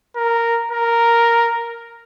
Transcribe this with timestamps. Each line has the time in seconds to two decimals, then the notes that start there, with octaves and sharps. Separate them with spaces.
0.16 A#4
0.72 A#4